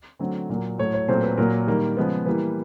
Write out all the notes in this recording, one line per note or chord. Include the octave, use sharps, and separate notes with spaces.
D3 F#3 A3 C4
A#2 F#3 A#3
A2 F#3 A3 C#5
C#5
A#2 F#3 A3 C4 C5
B4
A#2 F#3 A#3 A#4
D#3 G3 A#3
C#3 F3 G#3 B3
E3 G3 A#3 B4